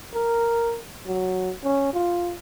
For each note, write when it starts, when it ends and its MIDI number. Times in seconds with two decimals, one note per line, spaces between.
0.14 0.75 70
1.06 1.51 54
1.64 1.92 61
1.93 2.33 65